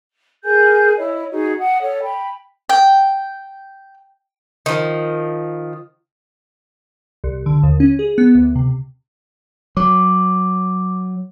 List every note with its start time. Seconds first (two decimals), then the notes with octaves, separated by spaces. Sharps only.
0.44 G#4 A#4 G#5 G6
0.98 E4 C#5 D#5
1.31 D#4 F#4 G#4
1.59 F#5 D#6
1.80 A4 C#5
2.02 G5 B5
2.69 G5
4.66 D#3 F3
7.24 C2
7.46 D3
7.63 D#2
7.80 C#4
7.99 G#4
8.18 B3
8.35 D2
8.55 C3
9.77 F#3 D6